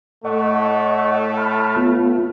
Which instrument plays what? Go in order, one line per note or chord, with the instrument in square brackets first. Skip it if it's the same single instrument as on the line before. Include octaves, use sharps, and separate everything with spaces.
[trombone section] A2 A3 [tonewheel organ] D#5 F#5 C#6
[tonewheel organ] A5 B5 F6
B3 F4